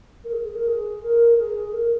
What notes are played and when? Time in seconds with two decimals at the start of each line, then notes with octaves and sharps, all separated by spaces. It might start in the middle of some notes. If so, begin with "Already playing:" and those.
0.24 A#4
0.32 G#4
0.44 G#4
0.55 A#4
0.67 G#4
1.02 A#4
1.38 G#4
1.68 G#4
1.73 A#4